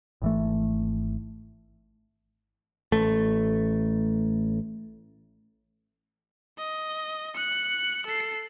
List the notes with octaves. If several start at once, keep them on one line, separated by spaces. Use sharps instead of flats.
G#1 E3 A3
A1 A3
D#5
F#6 C#7
A4 C7